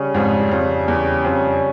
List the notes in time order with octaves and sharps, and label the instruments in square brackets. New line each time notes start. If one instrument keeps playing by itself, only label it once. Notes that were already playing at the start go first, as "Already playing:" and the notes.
Already playing: [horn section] C#3 G3 C#4
[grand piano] F2 G#2
F2
E2
F2